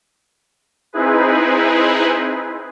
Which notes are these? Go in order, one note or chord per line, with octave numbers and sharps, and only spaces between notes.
C4 D#4 E4 G#4 B4